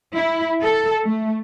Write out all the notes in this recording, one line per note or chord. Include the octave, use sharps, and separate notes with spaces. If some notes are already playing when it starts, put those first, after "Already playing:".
E4
A4
A3